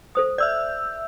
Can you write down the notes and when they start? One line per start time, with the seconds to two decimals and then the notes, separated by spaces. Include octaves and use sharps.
0.15 A4 C5 D#6
0.38 D5 E5 E6 G6